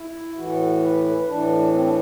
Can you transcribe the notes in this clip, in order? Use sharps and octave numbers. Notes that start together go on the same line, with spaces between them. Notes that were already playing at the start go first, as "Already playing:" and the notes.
Already playing: E4
A2 E3 F#4
B4
A2 E3 D4
C4
D4